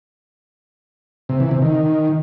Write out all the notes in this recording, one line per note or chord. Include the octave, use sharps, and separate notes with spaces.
C3
E3
C3
D#3